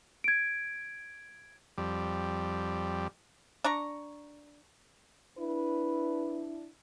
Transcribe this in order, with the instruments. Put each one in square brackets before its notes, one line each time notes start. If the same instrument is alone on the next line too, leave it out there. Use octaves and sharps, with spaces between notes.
[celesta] G#6 D7
[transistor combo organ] F2 G3
[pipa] D4 A#5 C#6
[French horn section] D4 E4 [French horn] B4